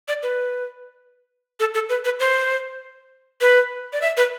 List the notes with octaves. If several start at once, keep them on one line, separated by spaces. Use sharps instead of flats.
D5
B4
A4
A4
B4
B4
C5
B4
D5
E5
B4